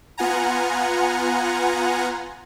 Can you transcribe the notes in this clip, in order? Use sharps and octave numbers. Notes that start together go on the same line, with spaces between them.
B3 F4 F#5 G#5 A#5